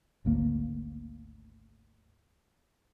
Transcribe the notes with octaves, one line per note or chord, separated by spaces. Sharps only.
G#1 D2 A#3